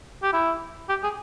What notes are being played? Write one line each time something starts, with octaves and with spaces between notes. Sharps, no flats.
G4
E4
G4
G#4